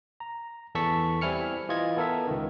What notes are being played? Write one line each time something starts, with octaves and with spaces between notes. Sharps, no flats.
A#5
E2 E3 A4 A5 C#6 B6
G3 C4 E4 G#5 F6 C#7
E3 F4 D#5 G#6
B3 A4 A#4 E5
C#2 D#3